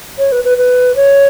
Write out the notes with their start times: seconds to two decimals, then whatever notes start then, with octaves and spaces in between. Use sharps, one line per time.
0.18 C#5
0.32 B4
0.45 B4
0.58 B4
0.96 C#5